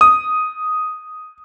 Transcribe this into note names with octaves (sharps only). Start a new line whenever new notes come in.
D#6